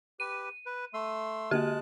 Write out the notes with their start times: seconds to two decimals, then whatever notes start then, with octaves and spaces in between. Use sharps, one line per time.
0.20 G4 B4 D#7
0.66 B4
0.94 A3 C6 E6
1.51 D3 G#3 A#3 F#4 G4 A5 F#6